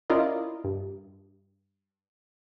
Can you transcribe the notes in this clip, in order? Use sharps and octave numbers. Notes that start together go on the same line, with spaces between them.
C#4 E4 F4 A#4 D5 D#5
G2